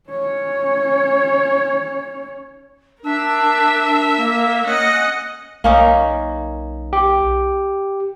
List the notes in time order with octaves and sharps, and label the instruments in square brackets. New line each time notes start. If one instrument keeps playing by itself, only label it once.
[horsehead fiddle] C#4 C#5
[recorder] D4 [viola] A#4 E5
[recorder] A#3
[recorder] C#4 [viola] D#5 F#5
[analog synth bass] B1 [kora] A#3 C#4 D#4
[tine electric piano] G4